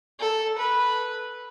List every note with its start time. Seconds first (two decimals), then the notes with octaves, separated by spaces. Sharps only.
0.20 A4
0.58 B4